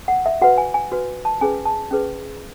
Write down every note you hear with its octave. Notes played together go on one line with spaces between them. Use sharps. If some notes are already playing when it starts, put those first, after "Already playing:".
F#5
E5
F#4 B4 F#5
G#5
G#5
F#4 B4
A5
C#4 G#4 B4 G#5
A5
C#4 G#4 B4